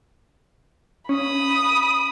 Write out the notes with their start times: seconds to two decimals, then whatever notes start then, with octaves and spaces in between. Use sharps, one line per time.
1.09 C#4 B5 D#6